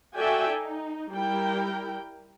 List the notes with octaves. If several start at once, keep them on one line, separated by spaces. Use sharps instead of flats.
F#4 A4 D5 E5 G5 G#5
D#4
G3 E4 A#4 G5